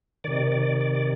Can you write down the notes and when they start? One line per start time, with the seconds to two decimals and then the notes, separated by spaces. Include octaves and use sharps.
0.24 C3 D#3 D5
0.52 D5
0.81 D5
0.95 D5